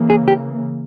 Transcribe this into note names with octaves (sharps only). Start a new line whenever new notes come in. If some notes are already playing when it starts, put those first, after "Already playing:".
Already playing: C#3 E3 A#3
G#4
G4